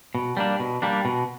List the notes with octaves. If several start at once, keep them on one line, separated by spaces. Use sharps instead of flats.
B2
G3 A#3 D4
B2
G3 A#3 D4
B2